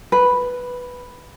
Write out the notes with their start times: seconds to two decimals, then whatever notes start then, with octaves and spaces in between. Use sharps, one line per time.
0.12 B4